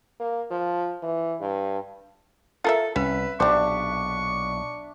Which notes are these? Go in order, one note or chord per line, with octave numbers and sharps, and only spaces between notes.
A#3
F3
E3
G2
F4 A4 A#4 E5
C2 C#4 B4 E5
B1 A#2 D4 G4 C5 C#6